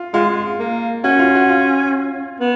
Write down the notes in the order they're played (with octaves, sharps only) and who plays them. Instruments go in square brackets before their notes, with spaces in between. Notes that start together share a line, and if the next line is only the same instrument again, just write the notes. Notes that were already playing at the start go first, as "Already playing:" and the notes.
Already playing: [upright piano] F4
[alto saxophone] G#3 [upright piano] F4
[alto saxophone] A#3
[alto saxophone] C#4 [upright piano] F#4
[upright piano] F4
F#4
F4
[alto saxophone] B3